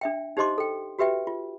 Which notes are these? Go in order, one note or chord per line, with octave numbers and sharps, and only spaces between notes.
D4 E5 G5
D#4 G4 C5 D#5 C6 D6
A4 G5
F#4 G4 B4 E5 G5
F4